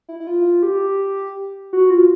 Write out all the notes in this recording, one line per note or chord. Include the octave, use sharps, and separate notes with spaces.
E4
E4
F4
G4
F#4
F4